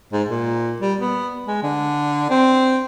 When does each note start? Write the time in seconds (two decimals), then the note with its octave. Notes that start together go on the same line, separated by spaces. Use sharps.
0.13 G#2
0.29 A#2
0.81 G3
1.00 B3
1.47 G#3
1.63 D3
2.30 C4